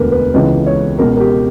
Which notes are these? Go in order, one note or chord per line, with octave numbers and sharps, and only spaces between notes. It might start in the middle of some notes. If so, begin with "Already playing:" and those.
Already playing: E1 D2 D3 A#4 B4
B4
C#2 C#3 E3 B4
C#5
C#2 B2 A#4
A#4
G4